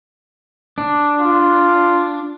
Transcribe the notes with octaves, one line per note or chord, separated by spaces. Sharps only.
D4
F4